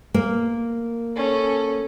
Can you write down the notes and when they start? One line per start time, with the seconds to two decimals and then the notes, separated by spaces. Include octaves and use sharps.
0.14 A#3
1.16 C#4 A4